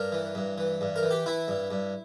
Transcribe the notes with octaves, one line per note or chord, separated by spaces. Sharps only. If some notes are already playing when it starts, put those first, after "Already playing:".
Already playing: G2 A#4
E3
G2
E3
G2
A#4
E3
G4
E3 E4
G2
G2